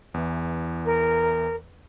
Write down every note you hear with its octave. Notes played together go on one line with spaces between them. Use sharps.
E2 E3
A#4